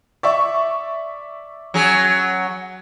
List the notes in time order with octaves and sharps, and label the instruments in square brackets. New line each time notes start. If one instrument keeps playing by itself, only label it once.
[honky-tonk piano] D5 E5 C#6
[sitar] F#3 C#4 G#4